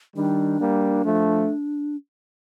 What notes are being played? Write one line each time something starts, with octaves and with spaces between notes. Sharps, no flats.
D#3 G3 D4
G3 A#3
F3 A3